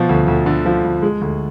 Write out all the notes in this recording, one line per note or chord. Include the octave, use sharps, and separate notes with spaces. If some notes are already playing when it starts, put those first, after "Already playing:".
Already playing: B2 F3
D2
D2
D3
F3
D2
G#3
D2